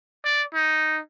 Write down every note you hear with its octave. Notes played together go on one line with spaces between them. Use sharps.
D5
D#4